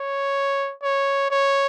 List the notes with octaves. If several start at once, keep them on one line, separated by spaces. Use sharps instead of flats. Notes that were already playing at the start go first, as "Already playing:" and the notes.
Already playing: C#5
C#5
C#5